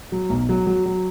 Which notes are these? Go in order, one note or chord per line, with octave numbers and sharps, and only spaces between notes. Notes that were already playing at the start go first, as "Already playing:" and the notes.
F#3
B1
F#3
F#3
F#3